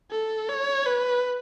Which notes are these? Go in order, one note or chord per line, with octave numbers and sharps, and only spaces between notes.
A4
C#5
B4